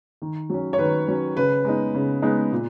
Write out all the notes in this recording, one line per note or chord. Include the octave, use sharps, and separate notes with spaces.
D#3
F#3 C#4
C#5
D#3 B4
F#3 C#4
C#3 B4
G#3 B3 D#4
C#3
G#3 B3 D#4
A#2